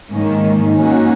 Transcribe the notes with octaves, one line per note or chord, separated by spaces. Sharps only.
G#2 D#3 A#3 C#4
D#3 A#3 C#4 F#4